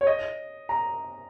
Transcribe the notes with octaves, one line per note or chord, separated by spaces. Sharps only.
C#5
D#5
A#5